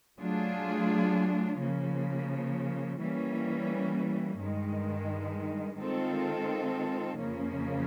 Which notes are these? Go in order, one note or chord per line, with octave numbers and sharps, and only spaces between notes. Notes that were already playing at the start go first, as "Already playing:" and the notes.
F#3 A3 D4 F4 G#4
C#3 F3 A#3
E3 G3 A#3 C#4
G2 D#3 G#3
D#3 G#3 C4 F4 A4
F2 C#3 F3 A#3 C#4